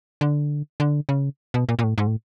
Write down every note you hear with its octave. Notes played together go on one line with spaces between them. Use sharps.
D3
D3
C#3
B2
A#2
A#2
A2
G#2
A2